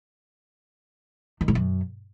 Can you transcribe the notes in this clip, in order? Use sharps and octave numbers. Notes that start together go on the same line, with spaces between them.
D#3
G#2
F#2